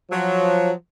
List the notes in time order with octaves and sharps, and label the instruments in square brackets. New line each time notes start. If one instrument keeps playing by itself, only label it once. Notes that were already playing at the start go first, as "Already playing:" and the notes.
[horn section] F3 F#3